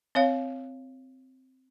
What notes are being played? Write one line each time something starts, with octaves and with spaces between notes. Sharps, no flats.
C4 C#5 F5